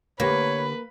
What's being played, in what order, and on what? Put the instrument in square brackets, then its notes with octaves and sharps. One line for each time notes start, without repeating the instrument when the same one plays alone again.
[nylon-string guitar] D3 G4 G5 [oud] A#3 [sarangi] B4 [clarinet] C#5